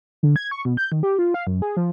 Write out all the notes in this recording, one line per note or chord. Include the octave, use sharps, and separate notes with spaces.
D3
G#6
C#6
B2
G6
D#3
G4
F4
F5
F#2
G#4
F3